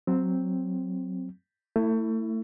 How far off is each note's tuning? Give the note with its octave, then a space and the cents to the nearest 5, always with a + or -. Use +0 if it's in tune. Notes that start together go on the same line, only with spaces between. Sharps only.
F#3 +0 C4 +0
A3 +30 E4 -5